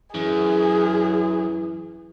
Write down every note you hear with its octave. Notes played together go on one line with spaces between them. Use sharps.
F#2 E3 G#4